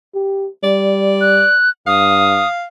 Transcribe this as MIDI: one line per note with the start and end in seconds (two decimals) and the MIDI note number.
0.14 0.48 67
0.64 1.44 55
0.64 1.54 74
1.21 1.70 90
1.87 2.43 43
1.87 2.65 77
1.87 2.48 87